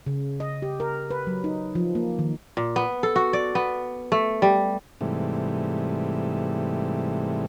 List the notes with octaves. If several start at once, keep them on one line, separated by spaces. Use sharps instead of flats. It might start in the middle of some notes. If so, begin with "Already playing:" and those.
C#3
D#5
G4
A#4
B4
F#3
D#4
F3
A#3
D#3
A#2
B3
A4
F#4
D5
B3
A3
G3
G#2 C3 E3 G3 A3